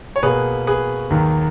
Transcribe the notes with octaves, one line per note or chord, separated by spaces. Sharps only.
C#5
B2 A#3 G#4 B4
G#4 B4
D#2 D#3 F#3